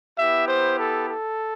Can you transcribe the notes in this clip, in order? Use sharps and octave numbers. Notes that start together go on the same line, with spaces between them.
B3 E4 G4 E5
C5
A4
A4